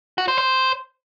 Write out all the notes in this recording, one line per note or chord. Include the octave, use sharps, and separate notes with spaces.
F#4
C5
C5